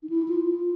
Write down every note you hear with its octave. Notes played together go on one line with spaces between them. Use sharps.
D#4
E4
F4
F4